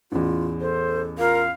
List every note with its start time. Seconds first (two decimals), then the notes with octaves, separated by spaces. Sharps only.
0.12 A1 E2 F4
0.61 A4 C5
1.18 F4 A#4 F5